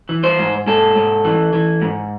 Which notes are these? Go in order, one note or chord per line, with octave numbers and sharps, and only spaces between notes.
E3
C5
G#2
G#2 A4
G#2
E3
E3
G#2